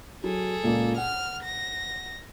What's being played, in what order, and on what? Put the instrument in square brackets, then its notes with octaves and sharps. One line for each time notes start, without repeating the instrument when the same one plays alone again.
[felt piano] F#3 [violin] G#4 A4
[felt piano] C#2 A#2 A#3
[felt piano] F#5 [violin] F6
[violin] A#6